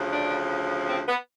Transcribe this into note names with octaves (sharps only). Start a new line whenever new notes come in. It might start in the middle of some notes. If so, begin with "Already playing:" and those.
Already playing: D2 C#3 F3
D4
C4
B3